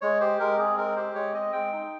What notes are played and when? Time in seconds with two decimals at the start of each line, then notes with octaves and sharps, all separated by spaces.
0.02 G#3 C#5
0.21 G4 C5
0.40 G#3 A#4
0.58 C4 G#4
0.77 G#3 A#4
0.96 G4 C5
1.15 G#3 C#5
1.33 C4 D#5
1.53 G#3 G5
1.72 D#4